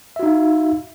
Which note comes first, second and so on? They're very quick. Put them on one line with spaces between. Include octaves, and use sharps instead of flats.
E5 F#4 D#4 F5